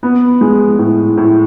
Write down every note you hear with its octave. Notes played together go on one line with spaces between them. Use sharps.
B3
G#3
A2
A2